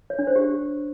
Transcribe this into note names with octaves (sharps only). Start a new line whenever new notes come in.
C#5
D4
C5
G4